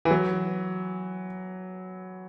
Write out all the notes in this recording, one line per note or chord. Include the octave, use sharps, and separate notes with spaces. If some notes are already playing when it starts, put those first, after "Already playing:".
E3
F#3